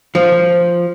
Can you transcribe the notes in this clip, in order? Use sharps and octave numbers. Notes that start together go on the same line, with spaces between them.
F3